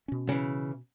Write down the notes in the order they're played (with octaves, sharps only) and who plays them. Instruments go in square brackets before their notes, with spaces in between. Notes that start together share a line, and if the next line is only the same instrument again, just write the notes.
[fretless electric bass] B2 C#4
[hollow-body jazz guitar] C#3 E3